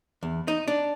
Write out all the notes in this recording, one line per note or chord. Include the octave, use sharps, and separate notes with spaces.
E2
D#4
D4